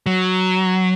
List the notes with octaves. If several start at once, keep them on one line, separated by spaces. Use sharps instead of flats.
F#3